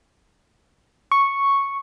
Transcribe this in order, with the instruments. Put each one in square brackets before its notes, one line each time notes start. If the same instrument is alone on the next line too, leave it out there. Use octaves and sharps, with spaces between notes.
[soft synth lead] C#6